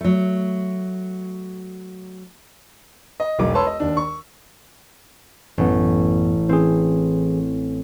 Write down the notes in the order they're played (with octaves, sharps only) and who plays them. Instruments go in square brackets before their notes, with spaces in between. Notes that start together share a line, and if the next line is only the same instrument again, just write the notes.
[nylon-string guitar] F#3 A3
[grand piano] D#5
E1 B1 D6
B4 C#5 A5 C6 E6
D#5
D#2 D4
C#6
[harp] A1 [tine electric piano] F#2 B3
[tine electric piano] E3 G#4 [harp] C4